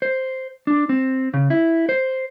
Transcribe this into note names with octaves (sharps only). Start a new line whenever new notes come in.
C5
D4
C4
C#3
E4
C5